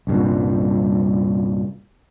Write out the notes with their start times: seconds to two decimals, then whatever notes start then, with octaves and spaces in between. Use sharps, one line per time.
0.07 C2 G2 A#2